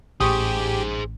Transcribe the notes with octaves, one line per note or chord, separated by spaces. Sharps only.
A1 G4 G#4 C5 C#6 D#6